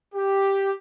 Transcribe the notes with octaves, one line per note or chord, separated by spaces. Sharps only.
G4